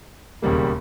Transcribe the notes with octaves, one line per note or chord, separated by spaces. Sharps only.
E1 D#2 C#3 G3 A#3